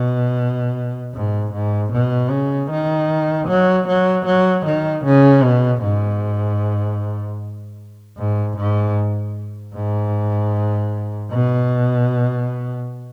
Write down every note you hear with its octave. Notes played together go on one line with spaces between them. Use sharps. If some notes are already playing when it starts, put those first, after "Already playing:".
Already playing: B2
G#2
G#2
B2
C#3
D#3
F#3
F#3
F#3
D#3
C#3
B2
G#2
G#2
G#2
G#2
B2